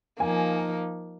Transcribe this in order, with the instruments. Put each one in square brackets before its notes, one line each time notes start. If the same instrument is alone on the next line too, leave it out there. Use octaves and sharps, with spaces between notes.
[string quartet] F3 A#3 D#4 [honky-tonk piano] G#5